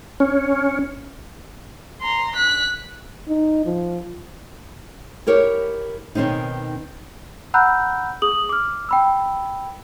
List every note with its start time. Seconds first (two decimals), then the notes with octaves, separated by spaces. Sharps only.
0.20 C#4
2.01 A#5 C6
2.36 F#6 B6
3.28 D#4
3.66 F3
5.27 E4 G4 A#4 C#5
6.15 B2 D#3 C4 C#4 D#4
7.54 F#5 A#5 B5 E6 F#6 G6
8.22 G#4 D#6 F#7
8.49 D6 F6
8.89 G5 B5 E6